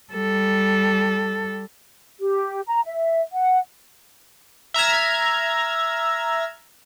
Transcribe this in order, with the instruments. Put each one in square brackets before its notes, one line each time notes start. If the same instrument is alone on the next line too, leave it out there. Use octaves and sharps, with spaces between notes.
[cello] G3 A4
[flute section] G4
A#5
E5
F#5
[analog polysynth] E5 A#5 F6 G#6